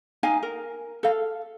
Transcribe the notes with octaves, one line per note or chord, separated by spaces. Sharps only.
D#4 F5 G#5
A#4
A4 F5